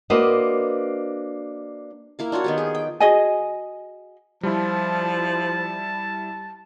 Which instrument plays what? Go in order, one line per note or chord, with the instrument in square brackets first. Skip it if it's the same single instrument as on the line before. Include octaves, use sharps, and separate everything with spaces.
[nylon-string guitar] A#3 D4 F#4 B4 C5 D#5
[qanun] A#3 E4 F5
D4 F4 F#4 C#5
D#3 B3 G4
G#4
G5
[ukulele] F#4 G#4 D#5 G#5
[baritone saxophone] F3 [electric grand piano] G3 E4 [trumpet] A5